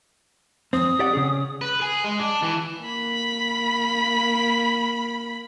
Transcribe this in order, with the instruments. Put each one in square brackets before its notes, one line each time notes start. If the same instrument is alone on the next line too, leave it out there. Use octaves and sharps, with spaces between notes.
[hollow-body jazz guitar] F2 C4 [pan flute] D#6
[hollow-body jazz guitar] G4 D5 F#5
C#3 C#4 G#4
[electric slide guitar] B4
G#4
G#3
D4
E3
[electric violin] A#3 B5